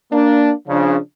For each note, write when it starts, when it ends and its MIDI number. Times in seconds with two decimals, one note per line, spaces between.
0.12 0.51 58
0.12 0.51 62
0.68 0.98 49
0.68 0.98 53
0.68 0.98 62